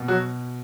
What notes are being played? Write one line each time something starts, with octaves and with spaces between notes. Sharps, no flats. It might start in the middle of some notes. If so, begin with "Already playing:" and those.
Already playing: B2
F#3 F#4